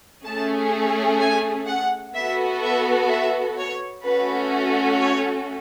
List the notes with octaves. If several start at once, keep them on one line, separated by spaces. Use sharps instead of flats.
A3 C#4 G#4 A5
G#5
F#5
B3 F#4 A4 E5
E5
E5
C#5
A3 C#4 F#4 A4 B4
C#5